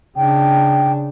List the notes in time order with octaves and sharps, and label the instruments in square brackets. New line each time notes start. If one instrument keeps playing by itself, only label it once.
[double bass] C#3 D4 [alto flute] G5